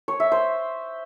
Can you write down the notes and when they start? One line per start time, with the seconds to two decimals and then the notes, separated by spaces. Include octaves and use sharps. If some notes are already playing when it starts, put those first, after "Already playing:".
0.08 C#5
0.20 E5
0.32 C5